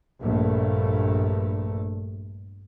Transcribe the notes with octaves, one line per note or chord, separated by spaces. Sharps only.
A#1 G2 A3